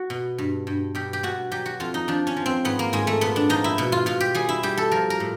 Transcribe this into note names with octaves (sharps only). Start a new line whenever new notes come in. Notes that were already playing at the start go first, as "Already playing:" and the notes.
Already playing: F#4
B2
G2
G2
B2 G4
G4
B2 F#4
F#3 G4
F#4
F2 F4
D#4
F3 D4
C#4
F3
C4
G#2 B3
A#3
G#2 G#3
A3
A#2 B3
D4
F3 D#4
E4
B2
F4
B2 F4
G4
G3 G#4
E4
G3 G4
A4
F3 A#4
A#4
A2